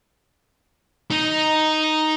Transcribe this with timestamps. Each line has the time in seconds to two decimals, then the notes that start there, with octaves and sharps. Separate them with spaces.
1.11 D#4